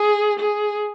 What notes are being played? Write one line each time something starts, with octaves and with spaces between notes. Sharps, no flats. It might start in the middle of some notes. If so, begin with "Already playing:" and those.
Already playing: G#4
G#4